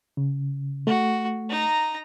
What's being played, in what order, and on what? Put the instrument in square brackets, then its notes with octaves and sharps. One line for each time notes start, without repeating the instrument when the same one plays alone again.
[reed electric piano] C#3
[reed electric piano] A3 [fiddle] F#4
[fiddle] D#4 A#5